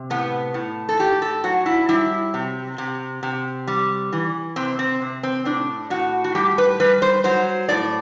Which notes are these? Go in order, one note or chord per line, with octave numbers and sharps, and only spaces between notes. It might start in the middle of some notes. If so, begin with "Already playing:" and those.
Already playing: C3
A2 B3
A2
A4
A2 G4
A4
F#3 F#4
E4
G3 E4
C3
C3
C3
G3
E3
C3 C4
C4
C3
C4
A2 D4
A2 F#4
F#4
G3 G4
B4
G3 B4
C5
F#3 C5
A2 D5